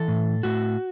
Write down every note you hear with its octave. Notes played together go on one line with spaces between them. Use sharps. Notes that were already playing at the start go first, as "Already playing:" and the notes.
Already playing: E3 A4
A2
A2 F#4